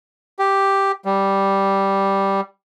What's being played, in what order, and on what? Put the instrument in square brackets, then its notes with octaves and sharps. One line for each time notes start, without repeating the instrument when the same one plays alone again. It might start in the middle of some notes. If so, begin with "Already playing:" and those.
[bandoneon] G4
G3